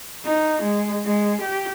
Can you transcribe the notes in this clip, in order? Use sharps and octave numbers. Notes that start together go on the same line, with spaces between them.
D#4
G#3
G#3
G4